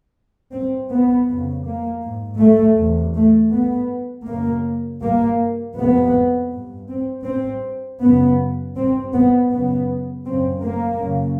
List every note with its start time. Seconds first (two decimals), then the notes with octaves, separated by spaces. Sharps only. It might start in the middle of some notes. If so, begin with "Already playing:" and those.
0.53 G2 C4
0.91 B3
1.28 F2 C#3
1.65 A#3
2.03 G#2
2.40 A3
2.77 E2 C3
3.15 A3
3.53 G2 B3
4.28 F#2 C#3 A#3
5.02 G2 A#3
5.77 F2 C3 B3
6.52 G2
6.89 C4
7.27 G2 C4
8.02 F#2 C#3 B3
8.76 G2 C4
9.14 B3
9.51 F#2 C#3 B3
10.26 F#2 C#3 C4
10.64 A#3
11.01 F#2 C#3